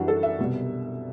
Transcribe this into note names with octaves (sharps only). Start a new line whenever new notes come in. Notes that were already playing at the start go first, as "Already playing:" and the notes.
Already playing: F#2 E3 G3 D4 F#4
A4
E5
C2 B2 G3